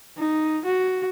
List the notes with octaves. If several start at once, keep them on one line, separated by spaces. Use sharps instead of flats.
D#4
F#4